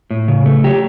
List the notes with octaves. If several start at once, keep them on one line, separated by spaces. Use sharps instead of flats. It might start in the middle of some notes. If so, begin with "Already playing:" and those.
A2
C#3
A3
F#3 G4